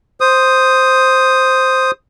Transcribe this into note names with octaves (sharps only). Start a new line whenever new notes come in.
C5 D#6